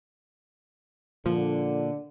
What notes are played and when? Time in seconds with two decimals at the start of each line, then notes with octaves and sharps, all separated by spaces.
1.26 A#2 D3 F3